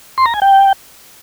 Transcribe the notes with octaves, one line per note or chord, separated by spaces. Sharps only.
C6
A#5
G#5
G5